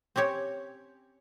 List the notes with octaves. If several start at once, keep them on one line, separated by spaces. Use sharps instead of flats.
C4 C#4 G4 C#5